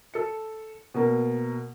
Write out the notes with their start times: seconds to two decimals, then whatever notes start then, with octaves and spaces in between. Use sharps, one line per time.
0.14 A4 C#7
0.94 B2 A#3